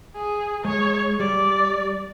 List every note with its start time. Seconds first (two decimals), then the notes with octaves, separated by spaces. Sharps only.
0.16 G#4
0.65 G#3 C#5
1.20 G3 D5